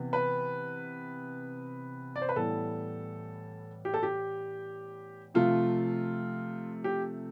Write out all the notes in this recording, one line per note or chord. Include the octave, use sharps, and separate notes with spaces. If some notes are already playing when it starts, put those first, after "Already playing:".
Already playing: C3 E3 B3
B4
D5
C5
B4
A2 E3 G3 B3 A4
G4
A4
G4
C3 F3 A3 F4
G4